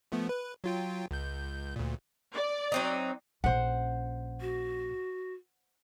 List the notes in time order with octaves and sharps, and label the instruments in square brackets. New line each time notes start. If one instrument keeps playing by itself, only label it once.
[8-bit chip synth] F3 A3 B3
B4
F#3 F4 G5
C#2 G6
D2 A#2
[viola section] D5
[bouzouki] F#3 C4 D#4
[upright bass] A#1 C#4 [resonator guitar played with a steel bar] C5 F#5
[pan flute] F#4